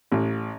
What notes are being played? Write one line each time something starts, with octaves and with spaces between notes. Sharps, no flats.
A1